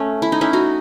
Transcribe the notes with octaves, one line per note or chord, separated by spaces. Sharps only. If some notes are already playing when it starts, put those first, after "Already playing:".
Already playing: A3 C#4
E4
D#4
C#4 E4
D#4 F#4